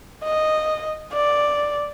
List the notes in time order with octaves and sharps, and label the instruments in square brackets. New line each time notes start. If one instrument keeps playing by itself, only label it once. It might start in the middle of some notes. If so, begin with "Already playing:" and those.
[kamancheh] D#5
D5